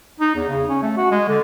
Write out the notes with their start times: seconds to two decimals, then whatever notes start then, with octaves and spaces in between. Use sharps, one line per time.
0.20 D#4
0.36 E2
0.49 C#3
0.69 C#4
0.82 A3
0.97 F#4
1.11 G#3
1.28 D3